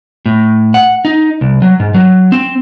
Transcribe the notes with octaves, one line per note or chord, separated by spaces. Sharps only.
A2
F#5
D#4
C2
F#3
G#2
F#3
C4